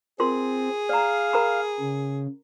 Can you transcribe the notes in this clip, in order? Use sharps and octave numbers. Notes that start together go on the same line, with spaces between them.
C4 F4 G#4 A#4 C6
D5 F5 A#5
A#4 A#5 B5
C#3